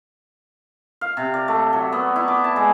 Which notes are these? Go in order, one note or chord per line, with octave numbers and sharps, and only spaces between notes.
F5
C3
D5
A3
F#3
B3
E4
D6
A5
G#3